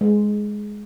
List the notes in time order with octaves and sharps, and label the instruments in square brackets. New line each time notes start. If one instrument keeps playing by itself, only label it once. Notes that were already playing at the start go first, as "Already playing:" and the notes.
[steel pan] G#3